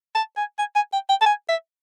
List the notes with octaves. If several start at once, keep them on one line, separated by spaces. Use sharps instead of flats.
A5
G#5
G#5
G#5
G5
G5
A5
G#5
E5